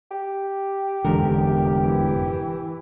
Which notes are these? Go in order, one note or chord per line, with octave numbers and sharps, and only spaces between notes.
G4
F1 E2 G#2 D3 A#4
E3